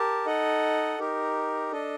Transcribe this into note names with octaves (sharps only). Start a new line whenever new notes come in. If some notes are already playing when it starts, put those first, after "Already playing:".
Already playing: G4 A#4 A5
D#4 A4 D#5 F#5
D#4 G4 A#4
D4 A4 D#5